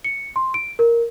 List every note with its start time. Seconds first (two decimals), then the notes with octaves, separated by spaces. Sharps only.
0.05 C#7
0.36 C6
0.54 D7
0.79 A#4